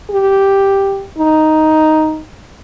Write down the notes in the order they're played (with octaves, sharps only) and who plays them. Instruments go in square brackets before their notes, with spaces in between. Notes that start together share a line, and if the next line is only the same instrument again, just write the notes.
[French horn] G4
D#4